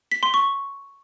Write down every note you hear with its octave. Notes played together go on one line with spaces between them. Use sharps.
B6
C6
C#6